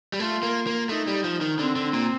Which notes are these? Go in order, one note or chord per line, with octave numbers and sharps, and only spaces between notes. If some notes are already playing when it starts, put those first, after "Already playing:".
G3
A3 F4
A#3
A#3
A3 D#4
G3
F3
D#3
D3 C4
D3
A#2